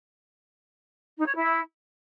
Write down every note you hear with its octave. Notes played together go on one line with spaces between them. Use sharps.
D#4
C#5
E4